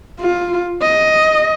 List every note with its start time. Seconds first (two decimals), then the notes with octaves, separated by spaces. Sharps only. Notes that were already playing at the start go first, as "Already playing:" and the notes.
0.20 F4
0.82 D#5